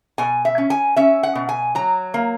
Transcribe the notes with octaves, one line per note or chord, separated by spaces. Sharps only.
B2 G#5
E5
C#4
G#5
C#4 E5
F#5
B2
G#5
F#3 A#5
A#3